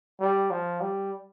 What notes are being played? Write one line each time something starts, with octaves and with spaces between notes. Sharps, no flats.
G3
F3
G3